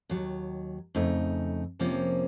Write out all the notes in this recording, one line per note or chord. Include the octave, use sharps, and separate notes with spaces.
D#2 D#3 F#3
F2 C#3 A3 D#4
F2 C3 F3 A#3 C#4